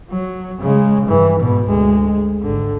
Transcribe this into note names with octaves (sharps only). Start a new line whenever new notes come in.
F#3
C#3 G#3
G2 E3
G#2 B2
D2 G#3
G#1 D3